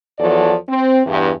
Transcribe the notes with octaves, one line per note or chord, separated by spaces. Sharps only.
E2 F3 F#3 A4 D5
C4
E2 G2